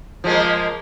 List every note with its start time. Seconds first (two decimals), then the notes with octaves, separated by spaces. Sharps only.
0.24 F3 G#3 A#3